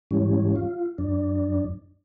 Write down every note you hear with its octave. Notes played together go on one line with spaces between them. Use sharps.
G#2 E3 G3 C#4
F4
F#2 D4